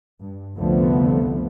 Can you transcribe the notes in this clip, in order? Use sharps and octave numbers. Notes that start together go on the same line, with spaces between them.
G2
C2 F2 D3 F3 A3 B3